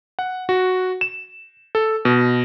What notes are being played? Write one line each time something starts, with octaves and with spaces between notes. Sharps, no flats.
F#5
F#4
E7
A4
B2